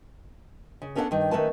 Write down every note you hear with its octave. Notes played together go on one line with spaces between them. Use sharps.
C#3
B3 C#4 D4 A4 D#5 F#5
G2 D#3
D#3 A3 C#4 B4 A5